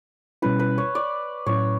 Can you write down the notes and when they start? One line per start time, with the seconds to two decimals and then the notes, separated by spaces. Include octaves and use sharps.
0.42 B2 G3 C#4 E4 B4
0.59 B4
0.78 C#5
0.95 D5
1.46 A2 F#3 C#4 E4 C#5